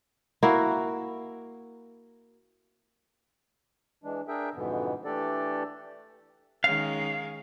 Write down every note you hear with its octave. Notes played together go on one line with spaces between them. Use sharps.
A#3 E4 F#4
E3 G#3 D4
D4 G#4 A#4 E5 G5
F2 G#2 B2 D3 E3 B3
E3 A3 D4 G4 A4 D5
D#3 G#3 C#4 F5